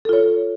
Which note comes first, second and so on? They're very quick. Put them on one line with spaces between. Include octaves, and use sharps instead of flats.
A4 F4 C#5